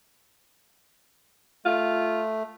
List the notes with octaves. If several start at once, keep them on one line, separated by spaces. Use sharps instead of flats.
A3 F4